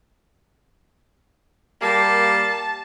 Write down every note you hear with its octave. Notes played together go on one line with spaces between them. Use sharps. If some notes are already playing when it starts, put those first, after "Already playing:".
G3 A#3 A5